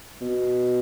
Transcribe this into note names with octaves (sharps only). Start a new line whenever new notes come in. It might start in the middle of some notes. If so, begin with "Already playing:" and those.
B2